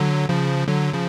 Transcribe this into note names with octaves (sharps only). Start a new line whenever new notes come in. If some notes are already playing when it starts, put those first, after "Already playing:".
Already playing: D3 F#3
C#3 F3
D3 F#3
C#3 F3